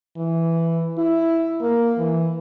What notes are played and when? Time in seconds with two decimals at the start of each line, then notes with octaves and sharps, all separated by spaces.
0.17 E3
0.98 E4
1.61 A#3
1.98 E3